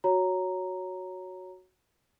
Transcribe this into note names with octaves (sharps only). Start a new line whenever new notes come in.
F#4 C#5 A#5